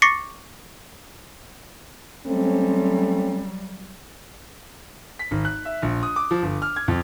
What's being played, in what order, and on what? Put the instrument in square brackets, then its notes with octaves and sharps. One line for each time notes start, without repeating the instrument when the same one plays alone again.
[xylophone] C#6 D6 A6 A#6 C7 C#7
[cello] F#3 G3 [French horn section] A3 C4 C#4
[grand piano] B6
G#1
F#6
E5
A#1
D#6
D6
F3
G1
F6
G#6
F2